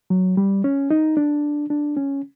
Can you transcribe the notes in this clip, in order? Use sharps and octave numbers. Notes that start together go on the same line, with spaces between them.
F#3
G3
C#4
D#4
D4
D4
C#4